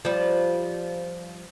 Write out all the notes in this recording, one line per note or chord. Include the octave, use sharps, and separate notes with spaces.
F3 G3